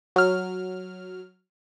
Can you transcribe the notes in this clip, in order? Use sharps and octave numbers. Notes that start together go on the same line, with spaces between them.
F#3 F6